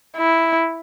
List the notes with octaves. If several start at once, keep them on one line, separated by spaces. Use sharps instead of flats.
E4